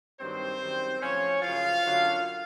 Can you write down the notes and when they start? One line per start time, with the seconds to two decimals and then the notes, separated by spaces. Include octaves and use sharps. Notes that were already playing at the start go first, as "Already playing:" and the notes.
0.21 G2 D#3 F#3 C4 C5
0.61 F#2 D#3 G3
1.02 A2 F3 C#4 C#5
1.42 F#2 C#3 F3 F4 F5
1.83 F#2 D3 F#3